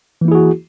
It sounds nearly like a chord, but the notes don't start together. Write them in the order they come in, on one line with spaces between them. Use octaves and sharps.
E3 A#3 E4 G#4 F#4